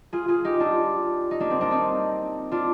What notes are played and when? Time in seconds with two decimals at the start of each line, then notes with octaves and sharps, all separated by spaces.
0.13 F4 G#4
0.28 F4 G#4
0.45 D#4 G4
0.60 D4 F4
1.31 D#4
1.40 A#3 D4
1.50 C4
1.61 A#3 D4
1.71 C4 D#4
2.51 D4 F4